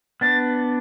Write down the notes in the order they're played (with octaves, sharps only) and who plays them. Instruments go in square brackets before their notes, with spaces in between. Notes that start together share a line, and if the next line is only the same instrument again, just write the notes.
[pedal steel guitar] B3 D4 [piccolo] A6